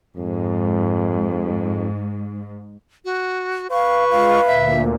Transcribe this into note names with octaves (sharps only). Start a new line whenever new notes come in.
F2 G#2
F#4
B4 F5 C#6
G#3 F4 F5
D2 A#2 E5